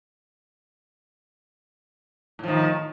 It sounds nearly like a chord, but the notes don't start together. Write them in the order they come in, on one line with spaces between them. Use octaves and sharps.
A2 F3 D#3